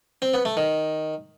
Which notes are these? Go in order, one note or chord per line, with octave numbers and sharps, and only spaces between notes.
C4
B3
A3
D#3